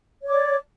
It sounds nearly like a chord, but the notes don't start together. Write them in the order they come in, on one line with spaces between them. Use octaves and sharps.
C#5 D6 D5